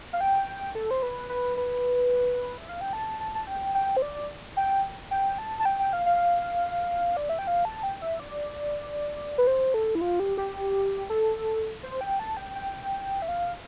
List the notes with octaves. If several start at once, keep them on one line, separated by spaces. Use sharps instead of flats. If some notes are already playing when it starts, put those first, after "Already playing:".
F5
G5
A4
C5
B4
B4
B4
E5
F5
G5
A5
A5
A5
G5
G5
C5
D5
G5
G5
A5
A5
G5
G5
F5
F5
D5
E5
G5
F5
A5
G5
E5
D5
B4
C5
A4
E4
F4
G4
G4
A4
C5
G5
A5
G5
G5
E5
F5